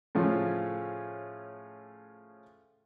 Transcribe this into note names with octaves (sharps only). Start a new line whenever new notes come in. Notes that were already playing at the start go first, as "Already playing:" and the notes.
A2 C#3 F3 C#4